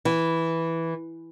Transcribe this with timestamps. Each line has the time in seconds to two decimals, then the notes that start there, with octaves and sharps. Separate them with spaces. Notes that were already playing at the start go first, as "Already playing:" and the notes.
0.05 E3